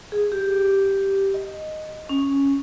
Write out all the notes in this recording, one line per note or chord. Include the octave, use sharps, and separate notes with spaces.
G#4
G4
D#5
C#4